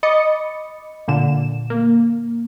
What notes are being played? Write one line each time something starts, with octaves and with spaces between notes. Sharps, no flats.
D#5 B5 D6 D#6 A6 C#7
A#2 D3 E7
A#3